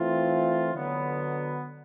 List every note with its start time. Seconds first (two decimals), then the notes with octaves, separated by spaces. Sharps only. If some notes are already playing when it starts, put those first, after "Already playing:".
Already playing: E3 A3 C4 F4
0.73 D3 F#3 B3